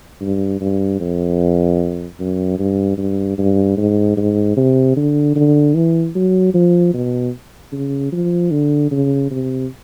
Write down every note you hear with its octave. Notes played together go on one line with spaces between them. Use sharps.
G2
G2
F2
F#2
G2
G2
G2
G#2
G#2
C3
D3
D3
E3
F#3
F3
B2
C#3
F3
D3
C#3
C3